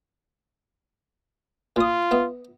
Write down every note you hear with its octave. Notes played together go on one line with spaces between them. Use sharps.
A#2 F4 D#6
B3 E5